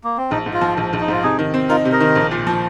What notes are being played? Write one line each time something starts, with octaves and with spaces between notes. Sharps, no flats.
A#3
C4
A#1 D#4
G#2
F4
F3
A#1
A#1
D#4
G#2 F4
C3 D#4 G#4
D#3
C4
D#4 F4 A#4
C3
A#4 D#5
D#3
A#1
A#2
F3